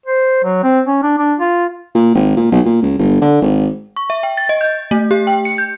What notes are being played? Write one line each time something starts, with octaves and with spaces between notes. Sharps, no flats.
C5
F#3
C4
C#4
D4
D4
F4
A#2
G#1
A#2
B1
A#2
C#2
G1
D3
G#1
C#6
E5
G5
A6
D#5
G6
A3
G4
G5
C#7
G6